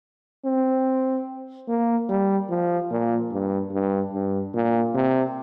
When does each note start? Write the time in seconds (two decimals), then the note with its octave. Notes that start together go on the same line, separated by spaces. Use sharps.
0.45 C4
1.68 A#3
2.09 G3
2.50 F3
2.91 A#2
3.32 G2
3.73 G2
4.13 G2
4.54 A#2
4.95 C3